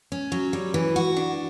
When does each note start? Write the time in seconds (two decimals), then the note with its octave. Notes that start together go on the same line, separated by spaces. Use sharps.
0.12 C#4
0.32 F#3
0.53 G3
0.74 E3
0.96 F#4
1.17 D4